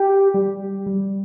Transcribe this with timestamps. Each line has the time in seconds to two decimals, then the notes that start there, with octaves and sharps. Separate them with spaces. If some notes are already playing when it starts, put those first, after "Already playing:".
Already playing: G4
0.34 G3
0.86 G3